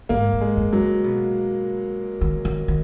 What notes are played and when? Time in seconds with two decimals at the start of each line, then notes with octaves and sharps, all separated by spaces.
0.09 G#2 A#3
0.33 G#2
0.41 G#3
0.57 F#2
0.73 F#3
0.80 C#3
1.04 B2
2.21 D#3
2.45 D#3
2.68 D#3